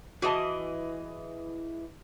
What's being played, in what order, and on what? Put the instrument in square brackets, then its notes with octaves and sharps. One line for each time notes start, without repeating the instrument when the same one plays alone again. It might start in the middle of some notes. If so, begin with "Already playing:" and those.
[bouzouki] E3 G#4 D#5 [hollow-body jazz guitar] F#4 A5